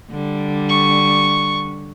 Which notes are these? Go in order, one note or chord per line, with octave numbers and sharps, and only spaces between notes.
D3 G3
C#6